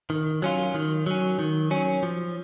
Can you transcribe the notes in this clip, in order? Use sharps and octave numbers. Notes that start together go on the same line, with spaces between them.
D#3
F#3 C#4 F4
D#3
F#3 C#4
D#3
F#3 C#4
F3